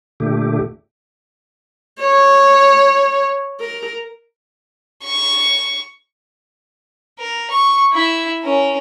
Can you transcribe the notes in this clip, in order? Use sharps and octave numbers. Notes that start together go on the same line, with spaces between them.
A#2 D3 A3 G4
C#5
A#4
C#6
A#4
C#6
E4 E5
C#4 A#4